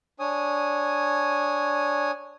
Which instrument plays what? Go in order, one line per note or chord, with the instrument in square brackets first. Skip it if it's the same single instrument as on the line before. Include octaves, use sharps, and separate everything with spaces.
[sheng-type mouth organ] D4 C#5 G#5 D#6